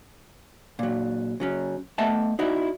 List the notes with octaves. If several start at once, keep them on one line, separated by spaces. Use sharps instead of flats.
A#2 F#3
C#3 F#3 C#4
A3 B3 D#5 E5 F#5 A5
D#4 E4 F#4 D5